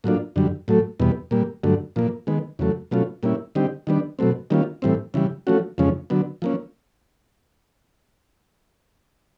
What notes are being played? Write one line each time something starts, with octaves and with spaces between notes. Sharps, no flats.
A2 F#3 A#3 D4 F4
F#2 D3 G3
A2 F#3 A3
E2 B2 G3 B3
A#2 G3 A#3
G2 D3 F#3 A3
A#2 F3 A#3
D#3 G#3 B3
E2 C#3 F#3 A3
B2 F#3 A3 C#4 F4
A#2 G3 A#3 C#4 E4
D3 G3 C4 D#4 G4
D#3 G3 B3 D4
B2 F#3 A3 C4
D#3 G3 A#3 C#4 F4
A2 E3 G3 C4
C#3 E3 G3
F3 A3 C#4 F#4
F2 C#3 F3 G#3 C#4
D3 F#3 B3
F3 A#3 C#4